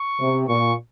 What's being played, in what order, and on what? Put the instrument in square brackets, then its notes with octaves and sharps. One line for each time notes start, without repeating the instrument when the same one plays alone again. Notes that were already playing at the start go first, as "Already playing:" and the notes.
Already playing: [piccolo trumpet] C#6
[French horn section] C3
[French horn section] A#2 [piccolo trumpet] C#6